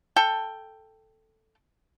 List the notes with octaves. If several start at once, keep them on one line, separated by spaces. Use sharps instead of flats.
A4 G5